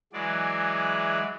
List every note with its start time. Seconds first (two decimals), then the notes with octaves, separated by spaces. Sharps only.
0.13 E3 F#3 G#3 D5